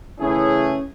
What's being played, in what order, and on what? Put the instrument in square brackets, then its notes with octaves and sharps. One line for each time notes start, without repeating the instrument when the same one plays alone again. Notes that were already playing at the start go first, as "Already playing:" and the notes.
[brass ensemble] C#3 E3 A3 C#4 E4 G#4